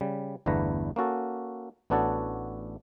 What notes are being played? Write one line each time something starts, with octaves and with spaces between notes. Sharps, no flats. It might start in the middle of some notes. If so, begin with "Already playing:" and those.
C#3 G3
G1 E2 D3 A3 B4 A#5
A#3 C#4 F#4 A4
A1 B3 D4 F#4 A4 C#5